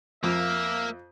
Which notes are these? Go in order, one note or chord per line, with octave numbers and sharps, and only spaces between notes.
F2 A#3 E5